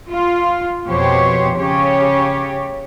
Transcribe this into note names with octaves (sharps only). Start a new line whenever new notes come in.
F4
F2 B2 G4 C5 C#5
C#3 G4 C#5